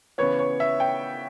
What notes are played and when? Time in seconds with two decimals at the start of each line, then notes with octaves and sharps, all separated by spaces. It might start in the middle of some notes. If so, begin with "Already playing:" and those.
0.18 C#3 E3 B3 C#5
0.39 C#5
0.60 E5
0.80 G5